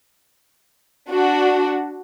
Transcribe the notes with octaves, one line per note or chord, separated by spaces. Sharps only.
D4 F#4